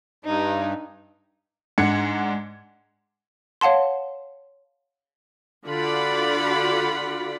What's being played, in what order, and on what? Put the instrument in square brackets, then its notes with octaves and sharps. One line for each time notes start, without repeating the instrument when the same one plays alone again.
[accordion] G2 [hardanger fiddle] D#4
[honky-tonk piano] G#2 D4 F#5 G#6 C#7
[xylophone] C#5 F5 F#5 A5 C6
[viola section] D3 F4 F#4 D5 F#5 B5